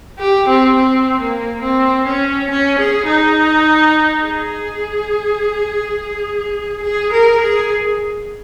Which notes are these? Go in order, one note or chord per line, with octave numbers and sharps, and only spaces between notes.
G4
C4
C4
A#3
C4
C#4
C#4
G#4
D#4
G#4
G#4
A#4
G#4